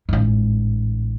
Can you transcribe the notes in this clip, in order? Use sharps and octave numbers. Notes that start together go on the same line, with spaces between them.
A1 G#2